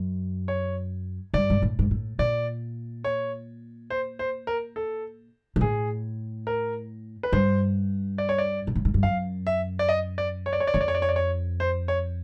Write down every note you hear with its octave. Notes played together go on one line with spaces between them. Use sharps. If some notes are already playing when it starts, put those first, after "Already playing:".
Already playing: F#2
C#5
G2 D5
G#2
A2
G#2
A2
A#2 D5
C#5
C5
C5
A#4
A4
A#2
A2 G#4
A#4
B4
G2 C5
D5
C#5
D5
A#2
A2
G#2
G2
F#2 F5
E5
D5
D#5
D5
C#5
D5
C#5
D5
F2 C#5
D5
C#5
D5
C#5
D5
C#5
C5
C#5